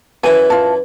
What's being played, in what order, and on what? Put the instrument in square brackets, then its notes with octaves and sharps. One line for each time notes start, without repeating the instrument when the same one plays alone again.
[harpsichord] F#2 E3 E4 [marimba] B4 [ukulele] G#5
[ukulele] F4 A5